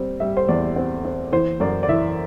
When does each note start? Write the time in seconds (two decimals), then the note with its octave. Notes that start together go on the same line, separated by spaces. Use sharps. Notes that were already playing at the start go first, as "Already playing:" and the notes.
Already playing: G3 C4
0.20 G3 E5
0.37 C5
0.49 E2 D5
0.76 C4
1.05 C4
1.32 E3 C5
1.60 F#2 D5
1.83 D5
1.89 E3 E5